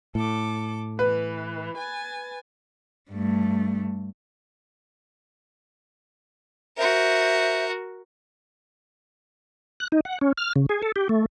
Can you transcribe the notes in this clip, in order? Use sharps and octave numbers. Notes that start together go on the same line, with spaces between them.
A2 A4 D6
E3 B4
G#5 A6
G2 A3
F#4 A#4 C5 E5
F#6
D#4
F#5
C#4
F6
C#3
G#4
A4
G4
A3